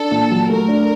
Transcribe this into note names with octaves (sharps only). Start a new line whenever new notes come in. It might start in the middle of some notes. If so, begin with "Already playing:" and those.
Already playing: D4 A4
A#2
F#3
A3 A#4
D4